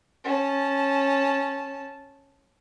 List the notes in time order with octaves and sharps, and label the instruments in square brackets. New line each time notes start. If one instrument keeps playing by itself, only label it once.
[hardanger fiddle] C#4 A5